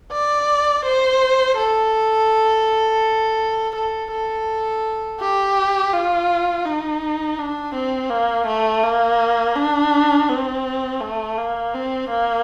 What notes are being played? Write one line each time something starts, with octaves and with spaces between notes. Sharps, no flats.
D5
C5
A4
A4
A4
G4
F4
D#4
D4
C4
A#3
A3
A#3
D4
C4
A3
A#3
C4
A#3